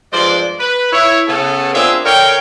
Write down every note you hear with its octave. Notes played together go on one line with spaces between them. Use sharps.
G2 F3 G#3 C5 D5
B4
E4 C#5
C#3 B3 A4
A#3 C4 D4 F4 G#4 E5
D3 A#4 C#5 F5 G5